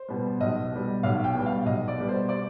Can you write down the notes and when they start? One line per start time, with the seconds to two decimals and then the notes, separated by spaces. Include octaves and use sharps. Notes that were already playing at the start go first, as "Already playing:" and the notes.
Already playing: C5
0.09 B2 G3
0.40 B1 D#5
0.72 B2 G3
1.03 B1 F5
1.24 G5
1.35 B2 G3
1.46 F5
1.66 B1 D#5
1.88 D5
1.98 B2 G3
2.09 C5
2.29 D5